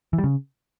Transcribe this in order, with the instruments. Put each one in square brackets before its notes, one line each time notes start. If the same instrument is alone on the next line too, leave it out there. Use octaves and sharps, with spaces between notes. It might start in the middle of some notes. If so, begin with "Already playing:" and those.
[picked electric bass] E3
G3
C#3